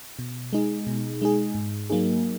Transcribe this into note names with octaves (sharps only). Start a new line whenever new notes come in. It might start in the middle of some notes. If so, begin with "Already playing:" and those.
B2
G#3 D#4 G#4
B2
G#3 D#4 G#4
G#2
F#3 A#3 D#4 G#4